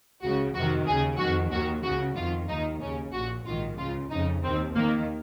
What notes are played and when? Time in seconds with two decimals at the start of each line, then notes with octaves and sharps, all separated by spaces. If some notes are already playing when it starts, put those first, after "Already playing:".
0.22 C#2 C#3 F#4
0.55 F2 C3 D#3 F#4
0.87 D#2 C#3 G#4
1.19 F2 D#3 F#4
1.52 D#2 D#3 F#4
1.84 C#2 C#3 F#4
2.16 F2 D#3 F4
2.49 D#2 D#3 D#4
2.82 D#2 C#3 C#4
3.13 A#1 A#2 F#4
3.46 A#1 G#2 D#3 F4
3.78 C#2 C#3 F4
4.11 F2 C#3 D#4
4.43 D#2 D#3 C4
4.75 D#2 D#3 A#3